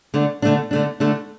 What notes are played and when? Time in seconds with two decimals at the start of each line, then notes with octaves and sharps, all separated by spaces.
0.14 D3 A3 D4
0.42 D3 A3 D4
0.71 D3 A3 D4
1.00 D3 A3 D4